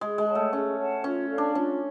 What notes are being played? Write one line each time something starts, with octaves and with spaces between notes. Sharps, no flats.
G#3 G#4
G#3
C#5 F#5 A5
A3
C#4 G#4
C#5 F#5 A5
C#4 F4
A4 D5 F5
D4
C#4 F4